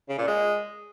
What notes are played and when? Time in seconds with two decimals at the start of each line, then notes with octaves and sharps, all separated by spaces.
0.09 C#3
0.18 A#2
0.27 G#3